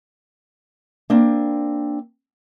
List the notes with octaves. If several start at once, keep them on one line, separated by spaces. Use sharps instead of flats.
A#3 C4 D4